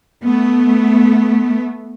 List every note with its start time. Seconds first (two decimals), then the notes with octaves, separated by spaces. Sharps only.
0.23 A3 B3